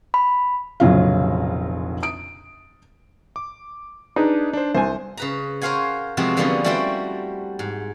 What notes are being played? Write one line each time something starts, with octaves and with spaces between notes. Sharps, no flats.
B5
F1 A#1 C#3 F#3 F4 F5
D#6 D7
D6
D4 D#4 G#4 B4
D4 C5
C2 C5 G#5
C#3 B4 A#5
A#4 C5 C#5 F5 F#5 G#5
C3 F3 G#3 B3 C4 F#4
D3 F3 G3 A#3 B3 C#4
G3 A3 E4 F#4 C5 G5
G#2